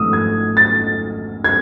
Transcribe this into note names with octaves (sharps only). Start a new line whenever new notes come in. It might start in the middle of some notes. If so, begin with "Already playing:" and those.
Already playing: G#1 G#2 F3 A3 D#6 E6
G#6
A6
G#6